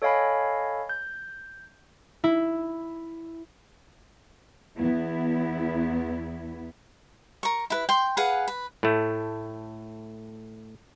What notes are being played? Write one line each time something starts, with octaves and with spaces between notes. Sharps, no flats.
A4 C#5 D#5 F5 G#5 B5
G6
E4
E2 B3 E4
A#4 C#6
E4 B4
G5 C6
G#4 B4 F5 F#5
B4
A2 A3